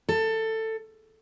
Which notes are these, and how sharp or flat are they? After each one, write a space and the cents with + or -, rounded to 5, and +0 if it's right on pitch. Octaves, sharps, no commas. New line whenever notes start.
A4 +15